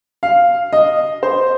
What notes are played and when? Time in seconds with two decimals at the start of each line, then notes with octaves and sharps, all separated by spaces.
0.23 F5
0.73 D#5
1.23 C5